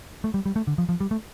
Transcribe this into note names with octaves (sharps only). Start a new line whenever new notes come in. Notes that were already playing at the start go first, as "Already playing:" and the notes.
A3
G3
G3
A3
D3
F3
F3
G3
A3